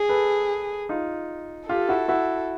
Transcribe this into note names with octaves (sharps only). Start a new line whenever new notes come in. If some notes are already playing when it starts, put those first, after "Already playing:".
Already playing: G#4
A4 B4
D#4 F4
F4 G4 A4
E4 F#4
E4 F#4